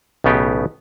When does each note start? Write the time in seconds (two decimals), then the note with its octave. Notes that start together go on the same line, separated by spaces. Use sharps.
0.24 B1 A2 C#3 B3 D#4 G4